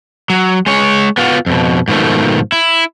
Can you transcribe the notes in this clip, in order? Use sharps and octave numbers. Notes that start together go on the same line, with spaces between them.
F#3
G#3 C#5
B3 F4 F#4
F2 B2
G#2 B2 D#3 F3 A3
E4